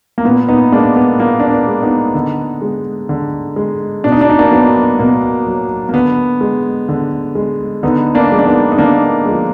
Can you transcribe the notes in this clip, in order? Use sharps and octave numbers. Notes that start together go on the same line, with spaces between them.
A#3
A#2 B3
B3 D#4
G#3 A#3 D4
B3
A#2 A#3
D4
B3
G#3
B3 D#4
D3
G#3
D3
G#3
B2 D4
D#4
D4
D#4
A#3 D4
F#3 B3
B2 A#3
F#3
A#3
D3 B3
G#3
D3
G#3
D3 B3 D#4
A#3 D4
F3 G#3
D4
B3 D#4
D#4
D3 A#3 D4
F3 G#3